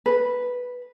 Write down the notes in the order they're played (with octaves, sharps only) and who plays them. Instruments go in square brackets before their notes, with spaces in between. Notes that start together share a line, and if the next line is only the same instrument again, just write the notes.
[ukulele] B4